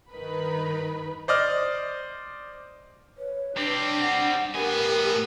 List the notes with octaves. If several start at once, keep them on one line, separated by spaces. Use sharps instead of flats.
G2 D#3 D#4 A#4 B4 B5
C5 D5 D#5 F6
B4 C#5
G3 C4 D4 G4
F#5
A2 B3 G4 A#4 G#5